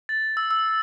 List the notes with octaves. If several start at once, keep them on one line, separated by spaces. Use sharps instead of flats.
A6
E6
E6